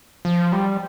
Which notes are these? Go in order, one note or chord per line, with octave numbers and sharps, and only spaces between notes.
F3
G3